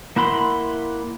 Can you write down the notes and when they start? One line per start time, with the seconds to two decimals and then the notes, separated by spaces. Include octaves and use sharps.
0.16 A#3 E4 F#5 B5 C6